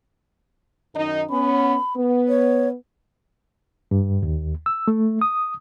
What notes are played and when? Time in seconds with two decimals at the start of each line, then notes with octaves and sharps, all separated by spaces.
0.95 F#2 D#3 D#4
1.30 B3 C#4 B5
1.97 B3
2.29 C#5
3.91 G2
4.23 D#2
4.66 E6
4.88 A3
5.21 D#6